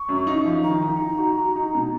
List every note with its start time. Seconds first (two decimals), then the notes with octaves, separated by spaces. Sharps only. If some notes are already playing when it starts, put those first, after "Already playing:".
Already playing: C#6
0.09 F#2
0.27 D#4
0.45 F3
0.63 D#3 A#5
0.82 D#4
1.00 D#4
1.18 F#4
1.38 F#4
1.56 D#4
1.75 B2